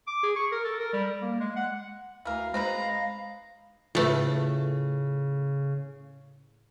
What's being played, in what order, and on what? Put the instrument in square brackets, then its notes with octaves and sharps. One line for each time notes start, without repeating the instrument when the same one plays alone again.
[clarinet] D6
G#4
C#6
A#4
A4
A#4
G3
A#3
G#3
F#5
[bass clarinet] D2 [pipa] E3 A#4 [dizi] F5
[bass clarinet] G#3 [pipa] C4 D#4 B4 [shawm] A#5
[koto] A2 A3 [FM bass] C#3 [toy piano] F4 B4